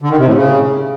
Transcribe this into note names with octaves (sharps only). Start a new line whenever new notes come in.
D3
D#3
C3
A2
C#3